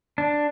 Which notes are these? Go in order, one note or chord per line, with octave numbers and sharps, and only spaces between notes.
D4